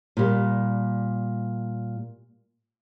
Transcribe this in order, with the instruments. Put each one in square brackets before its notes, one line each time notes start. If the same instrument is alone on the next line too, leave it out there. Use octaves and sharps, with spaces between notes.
[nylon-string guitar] A#2 G3